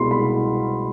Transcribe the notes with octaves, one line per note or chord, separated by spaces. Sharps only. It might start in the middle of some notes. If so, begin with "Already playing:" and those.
Already playing: C2 B2 G#3 B5 C6
B5